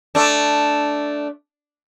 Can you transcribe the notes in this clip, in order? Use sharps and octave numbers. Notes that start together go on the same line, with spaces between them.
A3 D4